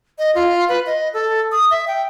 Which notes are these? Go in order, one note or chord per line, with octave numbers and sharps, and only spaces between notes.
D#5
F4
B4
D#5
A4
D#6
E5
G5